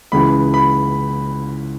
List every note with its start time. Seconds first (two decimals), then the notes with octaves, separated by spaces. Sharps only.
0.12 C#2 C#3 E3 B5
0.54 B5